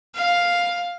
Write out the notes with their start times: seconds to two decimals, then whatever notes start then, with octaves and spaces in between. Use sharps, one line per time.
0.15 F5